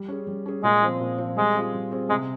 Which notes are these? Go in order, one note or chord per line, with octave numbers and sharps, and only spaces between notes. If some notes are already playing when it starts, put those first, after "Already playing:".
Already playing: G3
C#4 G#4
G3
C#4 G#4
A#2 G#3
F3 C4
A#2
F3 C4
G3 G#3
C4 F4 G#4
G3
C4 F4 G#4
C3 G#3